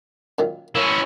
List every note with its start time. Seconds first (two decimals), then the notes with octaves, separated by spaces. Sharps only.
0.39 F#2 A#2 D#3
0.75 A#3 C#4 E4